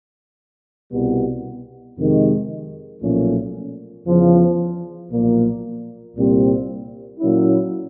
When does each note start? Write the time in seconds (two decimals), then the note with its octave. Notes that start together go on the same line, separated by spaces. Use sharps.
0.91 C2 B2 G3 B3
1.96 F2 C3 D#3 G#3
3.01 B1 A#2 F3 A3 C#4
4.05 E2 C#3 F3
5.10 B1 A#2 F3 A#3
6.15 C2 A#2 G3 C4
7.20 A#2 F#3 A#3 C#4 E4